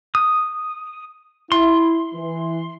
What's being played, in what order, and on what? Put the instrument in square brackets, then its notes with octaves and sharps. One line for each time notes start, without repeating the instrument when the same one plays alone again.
[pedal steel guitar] D#6
[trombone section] E4 [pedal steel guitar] C6
[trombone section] E3